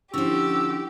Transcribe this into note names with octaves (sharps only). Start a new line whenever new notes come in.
D3 F3 C#4 E4 G4 E6